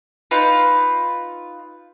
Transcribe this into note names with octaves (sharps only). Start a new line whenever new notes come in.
D#4 F4 B4